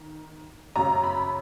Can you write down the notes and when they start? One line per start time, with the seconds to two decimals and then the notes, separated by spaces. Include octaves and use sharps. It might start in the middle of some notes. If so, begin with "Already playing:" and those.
Already playing: D#3
0.76 F#2 C#3 A#5
1.04 B5